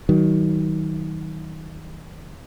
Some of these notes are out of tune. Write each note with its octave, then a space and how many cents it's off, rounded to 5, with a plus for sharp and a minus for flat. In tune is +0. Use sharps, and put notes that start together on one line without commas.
D#3 +25 F#3 +35